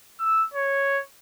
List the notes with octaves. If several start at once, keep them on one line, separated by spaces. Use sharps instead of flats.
E6
C#5